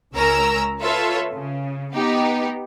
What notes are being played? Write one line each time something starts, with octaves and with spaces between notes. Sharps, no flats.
C#2 C#4 A#4 A#5 E6
F4 A4 B4 C#5 E5
C#3
B3 D#4 G4